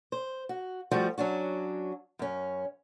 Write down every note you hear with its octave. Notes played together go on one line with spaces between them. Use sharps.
C5
F#4
F3 G3 A3 F#4
F#3 C#4 D4 F#4
F#2 C#4